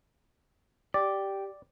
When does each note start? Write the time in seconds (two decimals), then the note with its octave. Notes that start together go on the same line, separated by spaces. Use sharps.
0.94 G4 D5